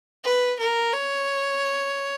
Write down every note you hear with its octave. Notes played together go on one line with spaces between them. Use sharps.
B4
A#4
C#5